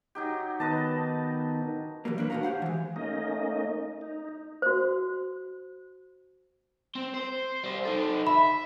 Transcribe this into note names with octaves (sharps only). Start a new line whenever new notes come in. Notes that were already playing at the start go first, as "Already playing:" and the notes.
F#3 D#4 G4
D#3 B3 D#4 B4 D#5 A5
E3 F#3 G3 A#3
A#3 D4 B4
A2 D4 D#4 F#4 F5 A#5
G4 C5 F5 F#5
E3 G#3
A3 A#3 C#4 D#4 D#5
D#4
F#4 C5
C4
C5
G3 C5
D#4 A4
E5 B5